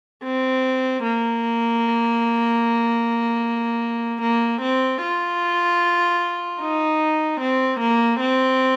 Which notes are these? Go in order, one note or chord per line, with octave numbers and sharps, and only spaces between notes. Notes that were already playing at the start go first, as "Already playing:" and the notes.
C4
A#3
A#3
C4
F4
D#4
C4
A#3
C4